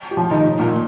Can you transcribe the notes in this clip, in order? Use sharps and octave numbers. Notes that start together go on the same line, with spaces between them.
G4
A2 F3 F4
D#3 D#4
A2
A#2 A#3